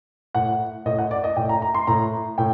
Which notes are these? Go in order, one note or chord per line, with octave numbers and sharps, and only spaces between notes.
A2 F#5
A2 D#5
F#5
D5
D#5
A2 G5
A#5
A#5
C6
A2 A#5
A2 G5